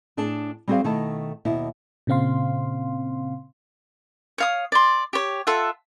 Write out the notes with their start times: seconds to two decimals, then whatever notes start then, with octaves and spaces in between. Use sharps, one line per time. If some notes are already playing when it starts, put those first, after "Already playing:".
0.17 A2 D4 G#4 A5
0.68 G3 C4 F#4 G#4 C5 F5
0.84 B2 D#3 A3 E4 A5
1.45 D#2 B2 E4
2.07 A#2 C#3 C4 F5 C6
4.38 C#5 F5 D#6
4.72 D5 C6
5.13 G4 C#5
5.47 F4 A4 E5 F#5